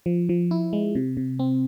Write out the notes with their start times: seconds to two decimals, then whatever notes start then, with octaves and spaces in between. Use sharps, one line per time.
0.06 F3
0.29 F3
0.51 E4
0.73 G#3
0.95 C3
1.17 C3
1.39 C4